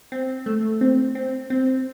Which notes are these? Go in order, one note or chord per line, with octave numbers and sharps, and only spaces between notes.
C4
A3
C4
C4
C4